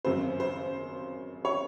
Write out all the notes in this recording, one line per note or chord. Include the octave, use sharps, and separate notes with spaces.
G#1 F#2 C#3 C5
C5
C#5